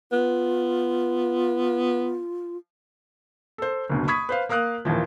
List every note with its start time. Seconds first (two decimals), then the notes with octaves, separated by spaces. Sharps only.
0.12 B3 F4
3.58 A4 C5
3.89 F#1 D2 B2
4.08 B5 C#6 D#6 G#6 B6
4.29 B4 C5 F5
4.49 A#3 A#4 F5 D#6 F#6
4.85 D#2 A#2 E3 F3